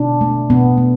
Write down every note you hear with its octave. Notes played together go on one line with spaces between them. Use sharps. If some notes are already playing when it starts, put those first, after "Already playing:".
Already playing: B2 D4
A3
B2 B3
A3